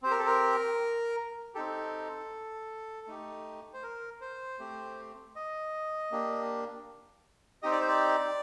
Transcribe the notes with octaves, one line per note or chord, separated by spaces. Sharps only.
C4 G4 C5
A#4
A4
A#4
C4 D#4 G4 A4
A3 D#4 G4
C5
A#4
C5
A3 C4 G4
D#5
A#3 D4 G4
C4 D#4 G4 D#5
D5
C5
D5